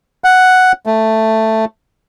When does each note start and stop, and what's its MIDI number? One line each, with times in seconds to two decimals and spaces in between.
0.24 0.72 78
0.86 1.65 57